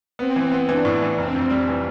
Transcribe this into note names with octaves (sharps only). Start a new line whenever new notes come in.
B3 C4
E3
B3
E3 D4
A2
E3
F1 C4
F2
G3
E3